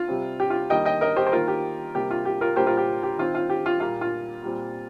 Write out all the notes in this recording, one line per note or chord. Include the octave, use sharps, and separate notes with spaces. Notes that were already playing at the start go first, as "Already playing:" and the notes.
Already playing: F4
C3 G3 C4
G4
F4
D#3 G3 A#3 D#5 G5
D#5 G5
A#4 D#5
G4 C5
C5
D#3 A#3 F4 A#4
G4
C3 G3 A#3 G4
F4
G4
F4 A#4
A#2 G3 A#3 G4 C5
F4 A#4
G4
G4
D#3 C4 F4
F4
G4
F4
A#2 G3 A#3 F4
F4
A#2 G3 C4